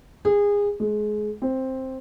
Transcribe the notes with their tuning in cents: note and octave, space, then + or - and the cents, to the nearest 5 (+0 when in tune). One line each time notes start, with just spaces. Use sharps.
G#4 -25
G#3 +25
C4 +5